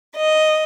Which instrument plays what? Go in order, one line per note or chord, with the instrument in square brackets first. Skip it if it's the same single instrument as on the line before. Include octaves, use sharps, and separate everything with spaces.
[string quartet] D#5